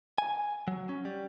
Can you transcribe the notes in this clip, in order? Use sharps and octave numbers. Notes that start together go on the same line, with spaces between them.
G#5
F#3
C#4
G3